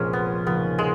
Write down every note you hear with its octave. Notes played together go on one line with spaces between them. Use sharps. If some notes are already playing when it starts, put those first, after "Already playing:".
Already playing: F1 A#1 A#2 F3 G#3 C#4
B3
D#2 C#3 F3 A#3 B3
G#3